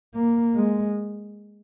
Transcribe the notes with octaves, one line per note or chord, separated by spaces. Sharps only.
A#3
G#3